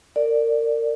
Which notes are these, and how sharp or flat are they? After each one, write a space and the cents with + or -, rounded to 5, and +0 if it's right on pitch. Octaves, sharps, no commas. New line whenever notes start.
A#4 -30 D5 +0